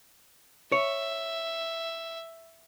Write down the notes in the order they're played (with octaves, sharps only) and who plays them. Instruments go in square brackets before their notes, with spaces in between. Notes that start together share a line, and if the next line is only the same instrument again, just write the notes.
[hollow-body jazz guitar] C#5 [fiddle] E5